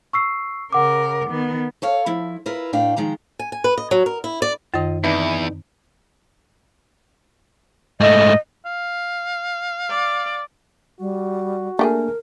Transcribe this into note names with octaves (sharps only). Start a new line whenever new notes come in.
C#6 E6 C7
C#3 A#4 F#5 D6
D#3 B3
A4 C#5 F5
F3 E4
E4 F4 A#4 B4
A2 D4 D5 F5 G5
D#3 F3 G#3 A#5
G#5
G#5
B4
D#5
F#3
A#4
E4
D5
F#2 D#3 F4 D#5
E2 C4 D#4 E4 B4 D5
G#2 A3 D#5
F5
D5
G3 F#4
A3 A#3 D4 G4 G#4 A#4